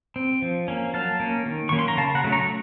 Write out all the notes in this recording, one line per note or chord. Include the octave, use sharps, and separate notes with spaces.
C4
F3
A#3 C#4
F#3 F5 A5
A#3 C#4
D#3
F#3 A#3 C#4 C#6
C6
A#5
C#3 F5 A5
F#5 A#5
F#3 A3 C#4
A#5 C#6